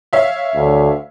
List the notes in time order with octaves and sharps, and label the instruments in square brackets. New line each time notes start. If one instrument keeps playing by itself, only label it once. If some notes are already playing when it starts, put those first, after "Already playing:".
[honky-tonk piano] C#5 E5 F5
[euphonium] D2